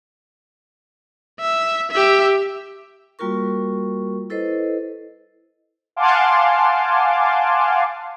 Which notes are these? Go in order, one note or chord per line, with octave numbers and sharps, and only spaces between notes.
E5
G4 E5
G3 A#3 F4 F#4 A#4 C#6
E4 A4 B4 C5 D#5
F5 F#5 G#5 A5 C6 D6